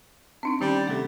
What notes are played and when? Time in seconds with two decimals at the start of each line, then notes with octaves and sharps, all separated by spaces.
0.43 C4 D4 D#4
0.61 D#3 G3 C#4
0.87 C3 A3 A4